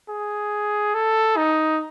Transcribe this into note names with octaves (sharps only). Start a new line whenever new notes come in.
G#4
A4
D#4